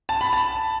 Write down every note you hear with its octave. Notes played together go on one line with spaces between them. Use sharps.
A5
B5
A5